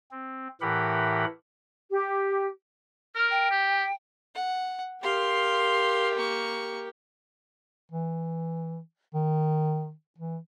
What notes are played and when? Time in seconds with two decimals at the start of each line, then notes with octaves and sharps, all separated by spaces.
0.11 C4
0.61 A2 E3 G4 A#4 F#5 B5
1.92 G4
3.15 A#4 F6
3.30 G5
3.51 G4
4.35 F#5
5.03 G4 A#4 F5 C6
6.15 A#3 C#6
7.92 E3
9.14 D#3
10.18 E3